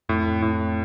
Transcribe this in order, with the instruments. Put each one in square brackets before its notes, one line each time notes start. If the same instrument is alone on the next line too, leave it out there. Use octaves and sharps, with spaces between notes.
[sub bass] F2 [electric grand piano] A2
[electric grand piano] A2